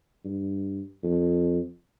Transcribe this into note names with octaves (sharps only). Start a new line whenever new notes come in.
G2
F2